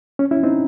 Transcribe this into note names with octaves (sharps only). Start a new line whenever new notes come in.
C#4
C#4 E4
C4 D#4